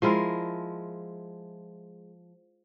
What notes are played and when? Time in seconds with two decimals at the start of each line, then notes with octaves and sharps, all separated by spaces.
0.02 F3 G#3 E4 A#4